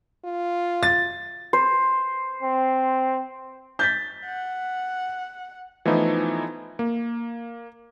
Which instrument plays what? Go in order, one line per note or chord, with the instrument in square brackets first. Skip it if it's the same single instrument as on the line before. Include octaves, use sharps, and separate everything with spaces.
[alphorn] F4
[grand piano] A6
[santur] C5
[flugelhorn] C4
[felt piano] G6 A6 B6
[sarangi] F#5
[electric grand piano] E3 F3 A3 B3 D#4 E4
A#3